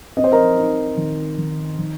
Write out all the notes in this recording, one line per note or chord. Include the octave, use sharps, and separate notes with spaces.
C4 D#5
C5
A#4 D#5
D#4
D#3
D#3
D#3